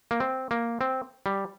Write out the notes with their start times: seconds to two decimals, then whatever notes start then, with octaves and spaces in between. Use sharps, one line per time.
0.11 A#3
0.20 C4
0.51 A#3
0.81 C4
1.26 G3